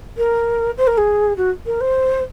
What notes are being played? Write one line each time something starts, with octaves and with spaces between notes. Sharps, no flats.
A#4
C5
A#4
G#4
F#4
A#4
C5